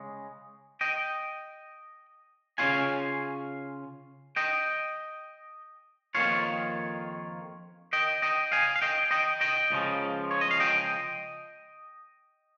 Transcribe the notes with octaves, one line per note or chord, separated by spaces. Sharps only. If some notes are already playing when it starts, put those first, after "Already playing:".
Already playing: C#3 G#3
D#5 G5
C#3 G#3 C#4 F4 F5 G#5
D#5 G5
F2 D#3 A#3 F4 C#5 F5
D#5 G5
D#5 G5
F5 G#5
F5
D#5 G5
D#5 G5
D#5 G5
C#2 C#3 F3
C#5
D#5
F5
D#5 G5